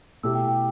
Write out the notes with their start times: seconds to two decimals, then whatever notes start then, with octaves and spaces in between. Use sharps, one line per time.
0.23 B2 A3 E4 G4 E6
0.35 G5
0.48 G5